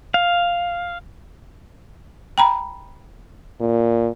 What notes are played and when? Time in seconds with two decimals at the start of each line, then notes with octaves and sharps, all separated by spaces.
0.14 F5
2.38 G5 A#5 B5
3.61 A#2